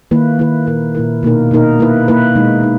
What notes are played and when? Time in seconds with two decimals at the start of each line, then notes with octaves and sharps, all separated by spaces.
0.11 D#3 A#3 E4 B4
0.39 D#3 A#3 E4 B4
0.67 A#2 A#3 E4 A#4
0.95 A#2 A#3 E4 A#4
1.23 B2 A#3 D#4 A#4
1.51 B2 A#3 D#4 A#4
1.79 A#3 E4 B4
2.08 A#3 E4 B4
2.35 B2 G#3 D#4
2.63 D#4